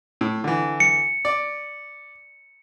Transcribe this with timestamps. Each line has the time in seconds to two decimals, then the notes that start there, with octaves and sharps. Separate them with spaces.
0.21 A2
0.44 D3 E3
0.80 C#7
1.25 D5